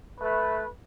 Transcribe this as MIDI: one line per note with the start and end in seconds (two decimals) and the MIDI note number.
0.20 0.65 57
0.20 0.65 71